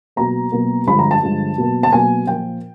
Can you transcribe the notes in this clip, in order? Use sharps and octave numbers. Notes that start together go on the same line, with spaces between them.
B2 F#3 A#3 A#5
B2 F#3 A#3
G2 D3 F3 G#3 B5
A#5
A5
G2 D3 F3 G#3
B2 F#3 A#3
A5
B2 F#3 A#3 G#5
A#2 F3 A#3 G5